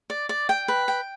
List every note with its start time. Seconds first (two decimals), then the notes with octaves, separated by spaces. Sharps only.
0.10 D5
0.29 D5
0.49 G5
0.68 B4
0.88 G5